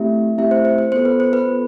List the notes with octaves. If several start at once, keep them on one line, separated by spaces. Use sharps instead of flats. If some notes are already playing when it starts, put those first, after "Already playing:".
Already playing: A3 C4 E4 G4 E5
A3 C4 E4 G4 E5
C5
C5
C5
B3 F4 A4 C5
B4
C5
B4
B3 F4 A4